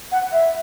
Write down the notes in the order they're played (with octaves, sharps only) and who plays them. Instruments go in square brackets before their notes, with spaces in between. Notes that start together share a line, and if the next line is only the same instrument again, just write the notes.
[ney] F#5
E5